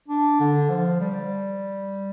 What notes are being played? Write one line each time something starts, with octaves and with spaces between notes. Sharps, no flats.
D4
D3
F3
G3